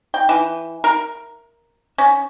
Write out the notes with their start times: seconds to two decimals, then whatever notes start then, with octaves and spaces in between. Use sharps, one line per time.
0.14 G5
0.29 E3
0.84 A#4
1.98 C#4